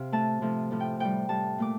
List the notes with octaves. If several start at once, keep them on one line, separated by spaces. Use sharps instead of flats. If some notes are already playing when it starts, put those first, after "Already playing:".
Already playing: C3 F5
A2 A3 A5
C3 F3 A3
A2 F3 A3
G5
A2 G3 G5
A2 G3 A5
A#2 A3 D6